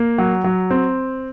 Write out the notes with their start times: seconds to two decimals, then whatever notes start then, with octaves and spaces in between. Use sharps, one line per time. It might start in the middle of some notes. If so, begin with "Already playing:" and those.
Already playing: A#3
0.18 F#3
0.44 F#3
0.71 C4